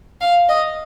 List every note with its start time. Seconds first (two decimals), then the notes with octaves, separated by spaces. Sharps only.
0.21 F5
0.49 D#5